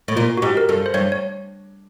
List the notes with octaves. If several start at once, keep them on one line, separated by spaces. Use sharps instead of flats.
A2
A#2 F4
F#4
G#2 G4
A#4
G2 A4
C5
G2 C#5
C#5